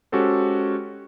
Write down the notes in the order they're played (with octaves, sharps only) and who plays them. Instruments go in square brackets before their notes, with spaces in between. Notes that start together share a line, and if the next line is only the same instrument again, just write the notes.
[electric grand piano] G#3 C#4 F#4 G4 A4 C5